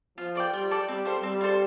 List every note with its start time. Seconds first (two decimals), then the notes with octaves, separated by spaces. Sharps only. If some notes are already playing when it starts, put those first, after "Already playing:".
0.18 F3 F4
0.35 A4 D5 G5
0.53 G3 F4
0.71 A4 D5 G5
0.88 G3 C4
1.05 F4 A4 C5
1.23 G3 C4
1.41 F4 A4 C5